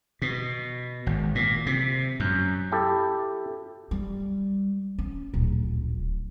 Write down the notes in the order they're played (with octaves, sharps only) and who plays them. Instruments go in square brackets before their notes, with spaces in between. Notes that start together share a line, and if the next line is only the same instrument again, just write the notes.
[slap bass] B2
G#1
A#2
C3
F#2
[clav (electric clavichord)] E4 G4 A4
[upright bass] G3
C#4
D1 A#1